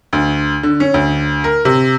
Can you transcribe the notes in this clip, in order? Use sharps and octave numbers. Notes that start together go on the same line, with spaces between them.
D2
D3
C#4
D2
A#4
C3